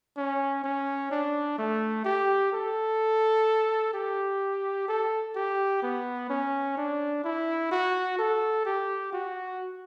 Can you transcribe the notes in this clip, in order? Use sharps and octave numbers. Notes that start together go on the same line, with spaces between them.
C#4
C#4
D4
A3
G4
A4
G4
A4
G4
B3
C#4
D4
E4
F#4
A4
G4
F#4